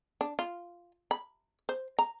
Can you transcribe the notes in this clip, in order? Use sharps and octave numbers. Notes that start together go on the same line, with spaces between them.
D4
F4
B5
C5
A#5